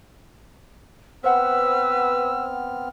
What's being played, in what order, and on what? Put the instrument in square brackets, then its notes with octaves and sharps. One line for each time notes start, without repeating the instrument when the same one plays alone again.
[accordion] B3 C4 F6 [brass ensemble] B4 [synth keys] C5 F#5 [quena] E6